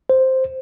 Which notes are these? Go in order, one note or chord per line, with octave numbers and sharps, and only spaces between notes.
C5